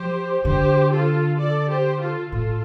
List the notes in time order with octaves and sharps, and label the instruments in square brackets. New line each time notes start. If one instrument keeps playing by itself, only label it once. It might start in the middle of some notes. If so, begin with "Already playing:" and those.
Already playing: [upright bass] F3 [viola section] G4 C5
[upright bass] D3 [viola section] G4 C5
[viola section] F4 A4
A4 D5
G4 C5
F4 A4
[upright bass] A2 [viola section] F4 A4